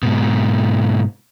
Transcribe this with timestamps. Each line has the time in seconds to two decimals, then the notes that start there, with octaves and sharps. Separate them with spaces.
0.03 G#2 B2